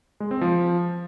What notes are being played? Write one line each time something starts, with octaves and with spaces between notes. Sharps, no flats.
G#3
C4
F3